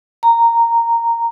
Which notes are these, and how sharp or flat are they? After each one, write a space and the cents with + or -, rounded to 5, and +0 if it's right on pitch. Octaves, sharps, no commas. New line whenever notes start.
A#5 -10